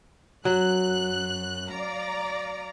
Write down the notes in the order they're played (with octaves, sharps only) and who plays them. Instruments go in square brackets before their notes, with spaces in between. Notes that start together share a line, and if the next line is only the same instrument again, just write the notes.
[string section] F#2 F#6 [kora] F#3
[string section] D5 F5 A#5